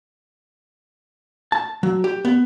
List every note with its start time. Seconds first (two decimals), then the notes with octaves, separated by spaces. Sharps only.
1.52 A5
1.83 F#3
2.04 G4
2.25 B3